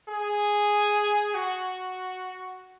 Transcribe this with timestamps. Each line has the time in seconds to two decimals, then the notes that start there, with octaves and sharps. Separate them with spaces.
0.09 G#4
1.34 F#4